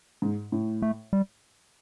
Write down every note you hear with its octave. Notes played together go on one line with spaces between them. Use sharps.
G#2
A2
A3
G3